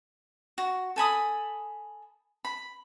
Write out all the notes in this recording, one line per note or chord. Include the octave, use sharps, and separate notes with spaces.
F#4
A4 G#5 B5 D#6
B5